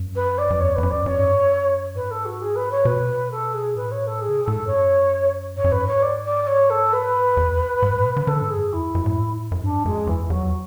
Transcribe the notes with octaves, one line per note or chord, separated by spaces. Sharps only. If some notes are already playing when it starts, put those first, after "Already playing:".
Already playing: F#2
B4
D5
F#2
E2 C#5
E2 B4
F#2
D5
F#2 C#5
G#2
F#2
G#2 B4
A4
F#4
G#4
B4
C#5
B2 B4
A4
G#4
A2 B4
C#5
A4
G#4
C#3
B2
A2 A4
G#2
F#2 C#5
G#2 C#5
F#2
G#2 B4
C#5
D5
D5
C#5
A4
B4
E2
G#2
A2
B2
D3
D3 A4
G#2
G#4
F#2
E2 E4
F#2
F#2
A2
F#2
G#2 D4
F#2 G#3
E2 E3
E2 F#3